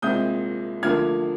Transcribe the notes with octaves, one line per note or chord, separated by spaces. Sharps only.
C2 A#2 G#3 C4 D#6 G6
D2 D3 F3 A#3 F6 G#6